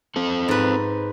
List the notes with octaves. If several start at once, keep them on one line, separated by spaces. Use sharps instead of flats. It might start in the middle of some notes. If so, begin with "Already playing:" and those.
C4 A4
G#2 B4